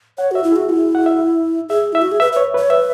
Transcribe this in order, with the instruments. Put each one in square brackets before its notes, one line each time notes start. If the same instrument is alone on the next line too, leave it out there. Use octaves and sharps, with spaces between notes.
[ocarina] C#5 [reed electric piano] F#5
[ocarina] F#4 [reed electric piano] E5
[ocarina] E4
[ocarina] F#4 [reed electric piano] G#4
[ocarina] E4 [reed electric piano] F#4
[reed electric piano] F#5
E5
[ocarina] G#4 [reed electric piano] E5
[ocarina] E4 [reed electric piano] E5
[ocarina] F#4
G#4
[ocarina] B4 [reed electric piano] E5
[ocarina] B4 [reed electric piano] C#5
[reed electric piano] B4 [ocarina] C#5
[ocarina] B4 [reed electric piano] E5